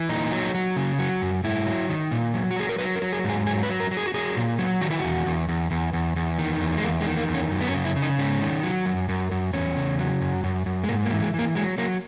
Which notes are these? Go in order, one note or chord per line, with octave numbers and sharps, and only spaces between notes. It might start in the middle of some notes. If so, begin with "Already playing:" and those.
Already playing: E3
A#2 D#4
F#3
F#3
C#3
F#3
F#2
G#2 E4
F#3
D#3
A#2
F#3
F#4
F#3 G#4
A#4
F#3 B4
A#4
F#3
G#4
G#2 G#4
F#3 G#4
B4
F#3
A#4
F#3
G#4
F#4
F#3 G#4
A#2
F#3
D#3 F#4
E4
E2 F#4
E2
E2
E2
E2
E2
D#3
E2
G#3
E2 A#3
G#3
D#3
A#3
E2
C#4
F#2
B3
C#4
C#3
E4
C#3
D#4
G#2 C#4
D#3
F#3
F#2
F#2
F#2
E2 C#4
C#3
F#3
F#2
F#2
F#2
G#3
G#2 A#3
A#3
E3
G#3
E3 A#3
F#3 G#3
F#3 A#3